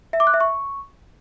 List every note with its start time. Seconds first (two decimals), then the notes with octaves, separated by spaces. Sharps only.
0.13 E5
0.20 D6
0.27 F#6
0.34 E5
0.40 C#6